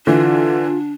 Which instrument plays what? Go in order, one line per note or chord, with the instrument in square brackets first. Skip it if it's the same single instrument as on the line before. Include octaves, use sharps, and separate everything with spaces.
[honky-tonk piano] D3 E3 [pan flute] D4 [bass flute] F4